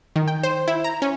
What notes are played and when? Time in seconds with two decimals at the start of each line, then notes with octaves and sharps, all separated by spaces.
0.16 D#3
0.28 G5
0.43 C5
0.68 E4
0.84 A#5
1.02 C#4